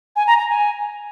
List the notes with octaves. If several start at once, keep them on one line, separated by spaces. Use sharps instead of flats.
G#5
A#5
A#5
G#5